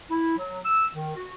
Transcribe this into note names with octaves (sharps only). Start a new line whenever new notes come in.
E4
F#3
E6
D#3
F#4